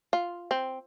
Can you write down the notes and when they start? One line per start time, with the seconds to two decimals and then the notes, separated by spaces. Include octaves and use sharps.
0.13 F4
0.51 C4